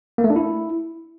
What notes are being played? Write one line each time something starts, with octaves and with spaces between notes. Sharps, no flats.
A#3
A3
D4
E4